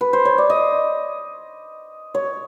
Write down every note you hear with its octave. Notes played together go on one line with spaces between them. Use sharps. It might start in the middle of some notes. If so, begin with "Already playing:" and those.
B4
C5
C#5
D5
D#5
C#5